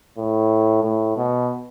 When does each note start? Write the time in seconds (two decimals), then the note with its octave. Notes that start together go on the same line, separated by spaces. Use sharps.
0.18 A2
0.84 A2
1.17 B2